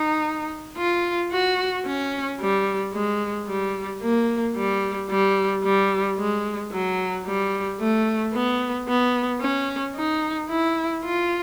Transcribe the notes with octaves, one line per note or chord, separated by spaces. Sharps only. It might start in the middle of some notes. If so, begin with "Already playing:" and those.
Already playing: D#4
F4
F#4
C#4
G3
G#3
G3
A#3
G3
G3
G3
G#3
F#3
G3
A3
B3
B3
C#4
D#4
E4
F4